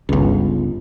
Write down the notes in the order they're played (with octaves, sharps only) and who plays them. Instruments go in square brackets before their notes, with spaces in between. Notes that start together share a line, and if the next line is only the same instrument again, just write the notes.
[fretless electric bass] G1 C#2